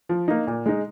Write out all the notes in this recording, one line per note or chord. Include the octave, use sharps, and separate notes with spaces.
F3
A#3 D#4
A#2
G#3 D#4